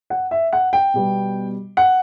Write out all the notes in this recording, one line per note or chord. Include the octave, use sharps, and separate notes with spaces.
F#5
E5
F#5
G5
B2 G3 B3
F#5